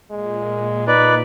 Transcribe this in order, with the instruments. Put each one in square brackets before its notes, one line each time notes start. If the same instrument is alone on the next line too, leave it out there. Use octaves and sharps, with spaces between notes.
[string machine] A#2 [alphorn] G#3
[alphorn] D#4 [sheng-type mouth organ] B4 D5